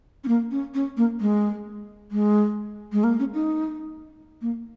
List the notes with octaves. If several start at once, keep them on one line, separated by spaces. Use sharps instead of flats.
C#4
A#3
C#4
C#4
A#3
G#3
G#3
G#3
A#3
C#4
D#4
A#3